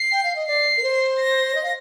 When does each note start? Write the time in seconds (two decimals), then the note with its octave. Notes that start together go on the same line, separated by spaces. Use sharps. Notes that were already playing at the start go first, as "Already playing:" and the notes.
Already playing: C7
0.11 G5
0.23 F5
0.35 D#5
0.46 D5 C7
0.77 A#4
0.82 C5
1.18 A#6
1.54 D#5
1.63 F5